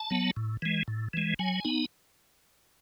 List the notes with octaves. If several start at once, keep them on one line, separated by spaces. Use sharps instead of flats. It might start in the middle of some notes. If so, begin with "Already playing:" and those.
Already playing: A5
F#3 B3
A2
E3 G#3
A2
E3 G#3
F#3 G#5
B3 D#4